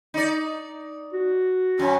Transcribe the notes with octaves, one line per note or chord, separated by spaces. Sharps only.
D#4 D5
F#4
F#2 C#4